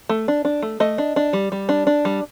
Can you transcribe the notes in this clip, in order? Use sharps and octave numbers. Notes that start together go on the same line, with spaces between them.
A3
D4
D4
A3
A3 D#5
D4
D4
G3
G3
D4
D4
G3